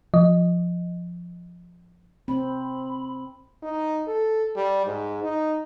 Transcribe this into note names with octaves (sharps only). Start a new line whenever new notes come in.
F3 D#5
C4 B5
D#4
A4
G3
G#2
D#4